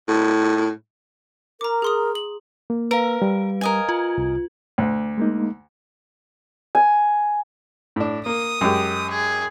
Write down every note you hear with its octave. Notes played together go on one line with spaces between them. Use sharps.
A2
A#4 A#5 D6
G#4 C6 D#6
F#7
A#3
A#4 B4 F5
G3
A#4 D#5 G#5
F4
C2
D2
G#3 A#3 D#4
G#5
A2 D4
A#3 D#6
F#2 G#3 G4
G#4